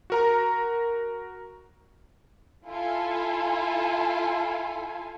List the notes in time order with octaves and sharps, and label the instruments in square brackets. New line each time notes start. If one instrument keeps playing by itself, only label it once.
[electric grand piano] F#4 A#4 A#5
[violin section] E4 F4 A4 G#5